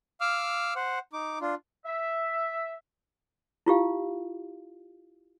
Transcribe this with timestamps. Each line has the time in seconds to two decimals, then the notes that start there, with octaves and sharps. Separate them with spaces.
0.21 F5 D6 E6 F6
0.76 C5 F#5
1.13 D#4 D6
1.41 D4 F4
1.85 E5
3.66 E4 F4 G4 F5